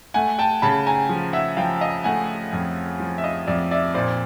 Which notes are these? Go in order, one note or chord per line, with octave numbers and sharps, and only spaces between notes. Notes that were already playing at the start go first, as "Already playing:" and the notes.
A3 F#5 G#5
G5 A5
C#3 A5 B5
G#5 A#5
F3
E5 F#5
F3 F5 G5
D#5 F5
A3 F#5 G#5
F2
F3
E5
D#5 F5
F2 D5 E5
D5 E5
A#2 C5 D5